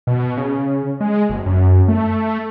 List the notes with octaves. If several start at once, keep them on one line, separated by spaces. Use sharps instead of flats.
B2
C#3
G#3
F#1
F#2
A3